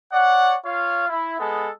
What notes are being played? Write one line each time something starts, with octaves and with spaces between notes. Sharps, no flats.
C#5 D5 F#5
F4 C#5 F5
E4
G#3 B3 A4